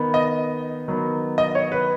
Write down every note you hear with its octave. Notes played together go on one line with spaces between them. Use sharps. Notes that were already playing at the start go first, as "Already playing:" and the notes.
Already playing: D#3 B3
D#5
D#3 F#3 B3
D#5
C#5
B4